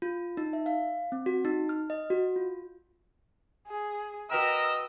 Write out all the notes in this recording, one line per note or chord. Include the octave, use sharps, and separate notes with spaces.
F4
D#4
E5
F5
C4
F#4
D#4
F6
D#5
F#4
F4
G#4
F#4 A#4 B4 D#5 G5 E6